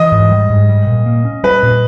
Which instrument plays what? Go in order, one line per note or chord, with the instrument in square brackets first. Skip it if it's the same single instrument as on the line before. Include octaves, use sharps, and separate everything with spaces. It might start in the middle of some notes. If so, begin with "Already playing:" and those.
Already playing: [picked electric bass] E3 [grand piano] D#5
[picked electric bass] G#2
G3
G#2
G3
A#2
A#3
C#4
[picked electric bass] G3 [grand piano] B4
[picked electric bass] A#2